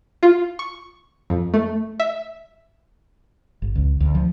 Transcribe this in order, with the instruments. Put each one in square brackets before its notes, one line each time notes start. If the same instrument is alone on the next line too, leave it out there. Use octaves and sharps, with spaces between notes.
[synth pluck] F4
C#6
F2
A3
E5
[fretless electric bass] G1
C#2
D2
F3